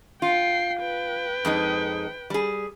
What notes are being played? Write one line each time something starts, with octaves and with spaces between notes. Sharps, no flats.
F4 G5 C7
B4 G5
F2 G#3 D#4
G3 G#4